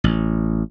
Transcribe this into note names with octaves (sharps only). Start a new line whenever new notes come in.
A1